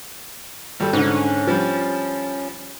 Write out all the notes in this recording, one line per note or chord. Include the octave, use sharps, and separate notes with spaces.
G#1 G3 A4
G#2 D3 C#4
F3 G3